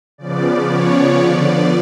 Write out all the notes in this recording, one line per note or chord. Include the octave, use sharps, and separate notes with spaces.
C#3 F3 B3 D5
C#5
D3 F3 B3 D5